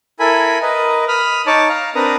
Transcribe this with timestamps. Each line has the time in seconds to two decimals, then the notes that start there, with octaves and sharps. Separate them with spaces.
0.20 E4 A4 A#4 G#5 B5
0.62 A#4 B4 D#5
1.08 B5 D#6 F6
1.47 D#4 C#5 A5 D6
1.69 F5 A#5
1.95 C4 D4 A#4 B4 A#5 D#6